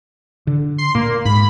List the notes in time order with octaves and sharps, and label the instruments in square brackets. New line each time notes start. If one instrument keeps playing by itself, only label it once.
[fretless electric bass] D3
[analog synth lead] C6
[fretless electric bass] A#2 [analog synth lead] A#3
[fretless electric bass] G#2 [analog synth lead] B5